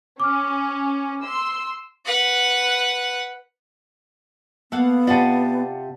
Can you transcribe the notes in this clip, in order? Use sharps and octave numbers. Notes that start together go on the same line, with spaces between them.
C#4 D6 F6
C6 E6
B4 F#5
A#3 B3 A4 F5 F#5
C3 F4 D5 F#5 A5